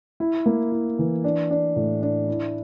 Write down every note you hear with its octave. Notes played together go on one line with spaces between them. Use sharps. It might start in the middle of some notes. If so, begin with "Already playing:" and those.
E4
A#3
E4
E3
D4
D4
A2
D4
E4